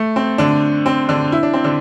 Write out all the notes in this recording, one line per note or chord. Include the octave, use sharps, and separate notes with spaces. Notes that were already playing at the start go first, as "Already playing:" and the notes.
Already playing: A3
C4
D3 D4
C4
D3 D4
E4
D4
C4
D3 D4